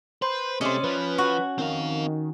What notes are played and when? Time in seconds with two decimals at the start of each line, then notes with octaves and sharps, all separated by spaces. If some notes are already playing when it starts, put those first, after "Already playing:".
0.22 B4 C5 C6
0.61 C3 A3 C#4 C5 D5 D#5
0.84 F3 B4
1.18 F#4 C#6
1.58 D#3 C4 F5